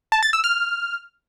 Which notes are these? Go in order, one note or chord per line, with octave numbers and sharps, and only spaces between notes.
A5
A6
E6
F6